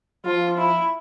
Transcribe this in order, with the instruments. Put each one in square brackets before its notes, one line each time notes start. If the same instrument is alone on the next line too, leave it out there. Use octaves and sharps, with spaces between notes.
[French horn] F3 [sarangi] F4
[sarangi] E4